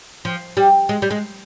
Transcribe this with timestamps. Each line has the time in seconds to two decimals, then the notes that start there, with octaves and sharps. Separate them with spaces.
0.25 F3
0.57 G3
0.89 G#3
1.02 G3
1.11 G#3